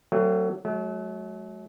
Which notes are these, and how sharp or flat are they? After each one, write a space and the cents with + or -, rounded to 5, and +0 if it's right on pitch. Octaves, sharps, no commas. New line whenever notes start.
F#3 +20 A3 +35 C4 +0
F#3 +0 A3 -45